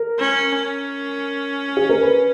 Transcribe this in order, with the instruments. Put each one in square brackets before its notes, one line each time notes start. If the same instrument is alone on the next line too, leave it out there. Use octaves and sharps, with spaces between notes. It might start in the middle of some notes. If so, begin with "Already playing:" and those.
Already playing: [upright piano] A#4
[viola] C#4
C#4
[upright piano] G#4
A#4
B4